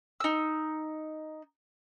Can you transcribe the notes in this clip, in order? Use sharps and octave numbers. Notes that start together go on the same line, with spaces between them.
D#4 E6